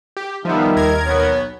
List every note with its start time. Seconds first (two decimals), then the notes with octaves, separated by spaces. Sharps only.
0.17 G4
0.45 D#3 F3 G3 B3 D#4 E5 F5
0.76 D#2 A#4 G#6
1.06 B1 B3 C#5